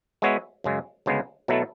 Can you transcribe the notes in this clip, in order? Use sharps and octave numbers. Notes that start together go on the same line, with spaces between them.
G#3 B3 F#4 C#5 E5
F#2 C#3 G#3
D2 C#3 G#3 B3
B2 F#3 A3 E4 A4